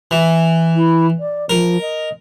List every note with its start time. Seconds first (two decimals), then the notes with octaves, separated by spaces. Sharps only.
0.11 E3
0.75 E4
1.19 D5
1.50 F3 A#4
1.81 D#5